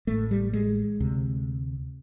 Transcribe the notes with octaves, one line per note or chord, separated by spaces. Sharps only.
A1 A2 A3
G3
G#3
D2 C3